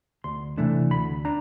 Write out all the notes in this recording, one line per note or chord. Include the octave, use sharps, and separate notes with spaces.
D2 C6
C3 E3 A3 D4
D2 B5
D4 A#5